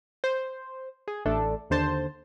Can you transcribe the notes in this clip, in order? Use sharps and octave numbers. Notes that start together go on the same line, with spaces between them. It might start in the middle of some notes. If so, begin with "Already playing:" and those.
C5
G#4
A1 A3 D4 A4
D#2 D3 C5 A5